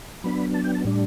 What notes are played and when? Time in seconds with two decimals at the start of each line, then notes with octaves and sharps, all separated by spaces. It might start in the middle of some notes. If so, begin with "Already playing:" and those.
0.24 F#3 B3 D4 B5
0.54 A5
0.64 G5
0.75 A5
0.85 A2 G3 D4